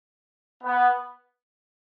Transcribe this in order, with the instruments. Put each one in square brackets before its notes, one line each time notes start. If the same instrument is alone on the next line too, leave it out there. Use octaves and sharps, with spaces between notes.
[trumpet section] B3